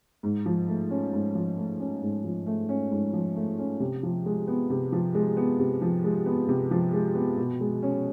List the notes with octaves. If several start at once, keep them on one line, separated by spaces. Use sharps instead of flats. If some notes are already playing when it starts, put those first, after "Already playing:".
G#2
F3
A3
C#4
G#2
F3
A3
C#4
G#2
F3
A3
C#4
G#2
F3
A3
C#4
C3
F3
G#3
B3
C3
F3
G#3
B3
C3
F3
G#3
B3
C3
F3
G#3
B3
B2
G#3
C#4